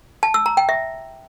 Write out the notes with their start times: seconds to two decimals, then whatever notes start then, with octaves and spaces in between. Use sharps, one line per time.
0.23 A5
0.34 E6
0.46 A#5
0.57 G5
0.69 E5